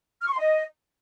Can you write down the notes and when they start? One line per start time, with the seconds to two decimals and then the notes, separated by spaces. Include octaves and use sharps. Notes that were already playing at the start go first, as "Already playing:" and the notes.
0.22 F6
0.27 C#6
0.33 C6
0.39 D#5